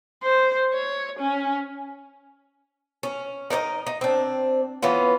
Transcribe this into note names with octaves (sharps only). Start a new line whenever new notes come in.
C5
C#5
C#4
C#4
D#4 A#4 C#5 D#5
D#4
C4 D4
E3 B3 C#4 F4